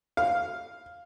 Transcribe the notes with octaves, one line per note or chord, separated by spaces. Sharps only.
F5